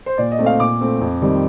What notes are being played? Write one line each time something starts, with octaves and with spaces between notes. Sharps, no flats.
C5
A#2 D5
D#5
A3 C4
F5
A#2 D6
A3 C4
F2
D#3 G3 C4